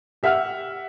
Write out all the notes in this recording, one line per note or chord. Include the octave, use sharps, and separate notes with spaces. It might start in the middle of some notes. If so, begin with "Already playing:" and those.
G4 E5 F#5 F6